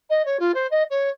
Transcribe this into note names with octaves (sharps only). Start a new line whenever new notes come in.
D#5
C#5
F4
C5
D#5
C#5